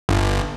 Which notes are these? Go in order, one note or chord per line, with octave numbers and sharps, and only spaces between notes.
G1